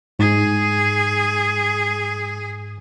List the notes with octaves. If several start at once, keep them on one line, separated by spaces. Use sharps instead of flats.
G#2 G#4